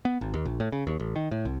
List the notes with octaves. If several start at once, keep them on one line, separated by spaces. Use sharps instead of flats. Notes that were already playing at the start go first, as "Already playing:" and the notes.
B3
G#1
D#2
A#1
A2
C#3
D#2
A1
D#3
A2
C2